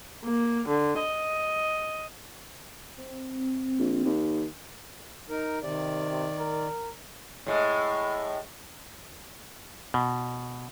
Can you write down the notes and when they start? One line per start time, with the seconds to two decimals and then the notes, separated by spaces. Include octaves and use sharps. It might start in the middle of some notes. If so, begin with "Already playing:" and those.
0.24 A#3
0.67 D3
1.00 D#5
2.97 C4
3.79 A#1
4.05 D#2
5.30 D#4 A#4
5.63 C3 D#3 D5
6.10 C3
6.39 A#4
7.47 A2 G#3
9.94 B2